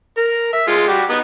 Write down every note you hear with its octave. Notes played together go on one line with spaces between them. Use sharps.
A#4
E5
G#3 F4
G3 F#4 G4
B3 D#4